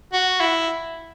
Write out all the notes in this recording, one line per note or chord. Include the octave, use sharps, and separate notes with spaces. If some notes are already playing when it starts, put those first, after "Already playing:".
F#4
E4